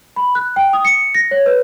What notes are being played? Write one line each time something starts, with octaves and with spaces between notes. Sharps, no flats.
B5
F#6
G5
D#6
C#7
A#6
C#5
B4